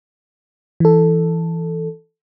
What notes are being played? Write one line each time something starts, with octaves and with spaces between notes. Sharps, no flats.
E3 A4